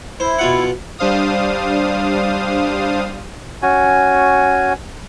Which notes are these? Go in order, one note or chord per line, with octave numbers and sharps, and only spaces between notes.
E4 C5
B2 F4 F#5
G3 D4 C5 F5 D#6
C#4 F#4 G#5